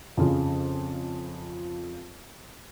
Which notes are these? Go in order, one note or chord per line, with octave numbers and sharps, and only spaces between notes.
F2 C#3 F3